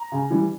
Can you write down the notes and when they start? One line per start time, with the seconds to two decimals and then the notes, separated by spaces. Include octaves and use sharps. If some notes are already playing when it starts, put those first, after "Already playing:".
Already playing: A#5
0.12 C#3
0.30 E3 G3